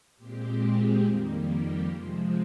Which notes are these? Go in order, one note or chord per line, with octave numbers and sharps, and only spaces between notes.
A#2 G#3 C4 G4
G#4
F2 D#3 G3 A#3
G4
C3 F3 G#3 C4